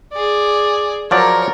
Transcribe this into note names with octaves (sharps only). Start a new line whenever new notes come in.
G#4 D5
F3 F#3 A#4 C#5 D5